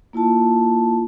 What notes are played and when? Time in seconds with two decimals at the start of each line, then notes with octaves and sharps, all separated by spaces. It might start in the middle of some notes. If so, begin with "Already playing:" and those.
0.13 A#3 E4 F4 A5